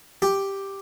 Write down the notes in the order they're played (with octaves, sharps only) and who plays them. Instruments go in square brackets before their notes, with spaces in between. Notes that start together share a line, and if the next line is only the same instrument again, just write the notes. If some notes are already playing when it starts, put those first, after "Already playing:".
[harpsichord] G4